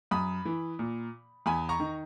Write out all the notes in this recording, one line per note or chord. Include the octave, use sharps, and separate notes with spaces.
F#2 B5 D#6
E3
A#2
E2 G#5 B5
A#5 C#6
D#3